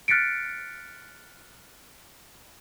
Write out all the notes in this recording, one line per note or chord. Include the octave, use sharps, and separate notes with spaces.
F6 F#6 A6 B6 C#7 D7